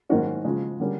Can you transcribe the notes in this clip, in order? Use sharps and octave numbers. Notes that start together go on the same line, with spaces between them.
G#2 D#3 F#3 A#3 C#4 F#4
C#3 F3 G#3
D3 G3 A#3 C#4